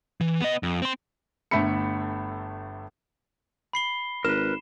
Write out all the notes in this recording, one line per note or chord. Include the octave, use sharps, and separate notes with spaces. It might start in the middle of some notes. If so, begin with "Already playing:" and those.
E3
B3 D#5
F2
C4 C6
G1 A3 A4 E5 B5 C#7
B5 C7 G7
G#1 A#4 B4 E7